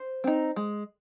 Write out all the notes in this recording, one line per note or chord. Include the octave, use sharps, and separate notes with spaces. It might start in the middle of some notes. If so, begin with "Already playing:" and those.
Already playing: C5
C4 D#4
G#3